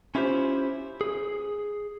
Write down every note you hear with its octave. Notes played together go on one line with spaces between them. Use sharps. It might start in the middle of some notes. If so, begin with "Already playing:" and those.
C#4 E4 F4 G4 C5
G#4